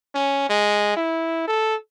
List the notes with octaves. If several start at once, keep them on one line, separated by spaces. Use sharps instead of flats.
C#4
G#3
E4
A4